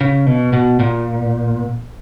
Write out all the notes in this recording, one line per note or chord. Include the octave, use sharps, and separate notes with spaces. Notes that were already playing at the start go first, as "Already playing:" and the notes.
C#3
B2
B2
A#2